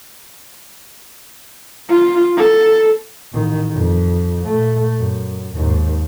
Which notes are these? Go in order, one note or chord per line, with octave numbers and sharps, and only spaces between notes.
F4
A4
A1 D#3
F2
A#2 A3
F#2
D#2 G#2